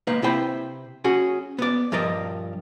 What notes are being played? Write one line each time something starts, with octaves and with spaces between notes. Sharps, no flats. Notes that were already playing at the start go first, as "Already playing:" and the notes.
A#3 D#4 B4 F5
C3 E4 C5 G5 B5
C#4 F#4 G#4
B3 D5
G2 F3 A#4 D5 D#5